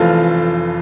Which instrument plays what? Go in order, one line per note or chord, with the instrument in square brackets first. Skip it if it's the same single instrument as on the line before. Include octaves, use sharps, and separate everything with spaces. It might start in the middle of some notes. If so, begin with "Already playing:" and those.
Already playing: [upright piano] F1 F2 E3 [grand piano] F4 A4